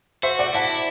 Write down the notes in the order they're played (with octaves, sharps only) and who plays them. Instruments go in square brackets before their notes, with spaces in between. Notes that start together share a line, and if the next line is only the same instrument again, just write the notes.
[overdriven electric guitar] F#4 [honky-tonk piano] C5 E5
[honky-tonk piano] D5 F#5
[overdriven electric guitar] E4 [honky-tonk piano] F#5 A5